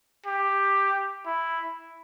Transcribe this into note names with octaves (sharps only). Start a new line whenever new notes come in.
G4
E4